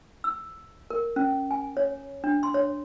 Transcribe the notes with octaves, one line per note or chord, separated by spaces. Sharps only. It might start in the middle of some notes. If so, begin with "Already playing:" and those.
E6
A#4
C#4
G#5
C#5
D4
C6
C#5